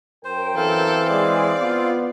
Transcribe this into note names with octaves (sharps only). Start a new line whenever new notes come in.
F#2 A#4 C5 G5
E3 C4 A4 F5
G#3 G#4 D5
B3 F4